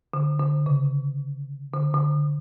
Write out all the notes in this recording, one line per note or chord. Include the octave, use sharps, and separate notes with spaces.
D3
D3
C#3
D3
D3